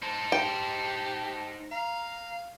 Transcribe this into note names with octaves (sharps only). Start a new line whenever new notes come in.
D#4 C5 A5
G4 G5
F5 A#5